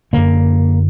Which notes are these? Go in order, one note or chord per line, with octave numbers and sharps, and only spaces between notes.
F#2 D3 A#3